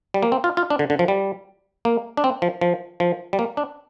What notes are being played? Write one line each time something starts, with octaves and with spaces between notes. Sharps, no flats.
G3
A#3
C4
F4
F4
D4
D3
D3
F3
G3
A#3
D4
C4
F3
F3
F3
G3
A#3
D4